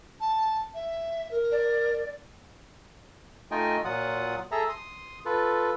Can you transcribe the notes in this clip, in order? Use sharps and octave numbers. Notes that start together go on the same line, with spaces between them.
A5
E5
A#4
D5
A3 D#4 F4 D#5 G5 G#5
A#2 F#3 F4 F#5 D#6
G#4 A4 E5 A#5
C6 D#6
F4 A4 B4